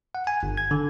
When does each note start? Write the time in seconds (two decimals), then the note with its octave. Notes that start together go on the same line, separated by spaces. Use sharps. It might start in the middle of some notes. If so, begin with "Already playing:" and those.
0.15 F#5
0.27 G#5
0.43 G1
0.57 G#6
0.71 D3